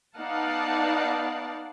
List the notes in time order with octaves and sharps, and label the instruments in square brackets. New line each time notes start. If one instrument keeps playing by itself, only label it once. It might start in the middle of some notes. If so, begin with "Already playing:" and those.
[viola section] B3 D#4 D5 F5 F#5 A5